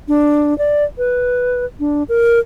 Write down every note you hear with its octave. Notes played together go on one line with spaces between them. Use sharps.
D4
D5
B4
D4
A#4